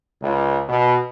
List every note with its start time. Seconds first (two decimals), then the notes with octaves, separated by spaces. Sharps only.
0.22 C#2
0.69 B2